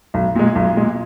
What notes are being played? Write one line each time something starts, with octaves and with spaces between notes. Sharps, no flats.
B1
A#2 G#3
B1
A#2 G#3